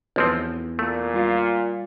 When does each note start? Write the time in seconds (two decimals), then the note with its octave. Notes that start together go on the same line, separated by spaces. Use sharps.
0.16 B1 E2 F3 C4
0.79 A#2 A3
1.14 G3 F4 F5